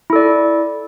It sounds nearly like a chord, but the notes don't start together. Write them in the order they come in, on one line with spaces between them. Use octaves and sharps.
E4 A4 D5